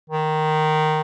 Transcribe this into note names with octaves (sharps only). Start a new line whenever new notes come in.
D#3